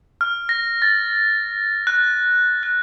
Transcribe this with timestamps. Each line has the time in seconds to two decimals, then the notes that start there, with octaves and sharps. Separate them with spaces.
0.21 F6
0.49 A#6
0.82 A6
1.87 F#6
2.63 F#6